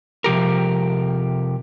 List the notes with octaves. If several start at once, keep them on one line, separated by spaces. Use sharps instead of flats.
C3 F3 G4 A#4